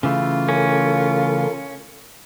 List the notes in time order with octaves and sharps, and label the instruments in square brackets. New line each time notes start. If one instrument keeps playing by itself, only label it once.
[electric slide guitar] C#3 E3 A3 [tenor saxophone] F4
[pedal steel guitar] C#4 [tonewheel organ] A4 A#4